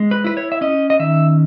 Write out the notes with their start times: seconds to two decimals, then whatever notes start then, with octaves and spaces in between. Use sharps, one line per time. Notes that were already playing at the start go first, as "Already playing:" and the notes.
Already playing: G#3
0.11 B4
0.24 E4 B4
0.37 C#5
0.52 E5
0.61 C#4 D#5
0.90 D#5
0.99 D#3 E5